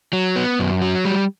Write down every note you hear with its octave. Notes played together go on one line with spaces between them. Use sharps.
F#3
B3
F#2
F#3
G3